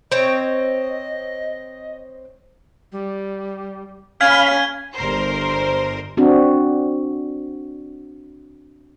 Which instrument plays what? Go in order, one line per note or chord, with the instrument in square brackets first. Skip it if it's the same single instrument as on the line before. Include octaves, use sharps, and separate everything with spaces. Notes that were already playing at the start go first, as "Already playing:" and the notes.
[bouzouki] C4 C#5 [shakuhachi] D#5
[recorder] G3
[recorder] C#4 [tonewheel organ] F5 B5 [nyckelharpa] G#5 [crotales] F6 G#6
[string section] G1 A#4 C5
[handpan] C4 D4 F#4